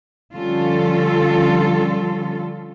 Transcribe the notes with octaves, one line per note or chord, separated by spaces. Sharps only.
D3 F3 G3 C#4 F4 A4